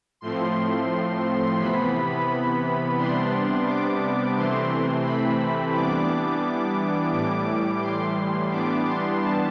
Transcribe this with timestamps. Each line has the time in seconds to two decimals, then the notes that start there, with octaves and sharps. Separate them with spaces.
0.21 A2 F3 A3 C4 C6
1.59 C3 E3 B3 B5
2.97 C3 G3 B3 D4 C6
3.66 D6
4.36 C3 E3 A3 C4 C6
5.05 B5
5.73 E3 G3 B3 D4 D6
7.12 A2 E3 G3 D6
7.81 C6
8.51 E3 G3 B3 D4 D6
8.86 C6
9.20 A5